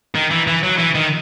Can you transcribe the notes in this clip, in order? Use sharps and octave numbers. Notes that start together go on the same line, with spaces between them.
D#3
E3
E3
F#3
E3
D#3